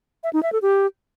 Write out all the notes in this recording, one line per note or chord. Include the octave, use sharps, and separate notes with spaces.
E5
D#4
E5
A4
G4